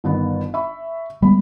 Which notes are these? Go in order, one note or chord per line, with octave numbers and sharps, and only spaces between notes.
G1 D#3 B3
E5 B5 C#6
G3 G#3 B3 B5